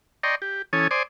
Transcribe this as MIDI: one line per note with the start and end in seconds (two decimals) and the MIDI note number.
0.23 0.35 74
0.23 0.35 75
0.23 0.35 79
0.23 0.35 82
0.23 0.35 84
0.23 0.35 85
0.42 0.62 67
0.73 0.88 52
0.73 0.88 61
0.73 0.88 69
0.73 0.88 73
0.73 0.88 80
0.73 0.88 87
0.91 1.03 72
0.91 1.03 74
0.91 1.03 80
0.91 1.03 84
0.91 1.03 86
0.91 1.03 87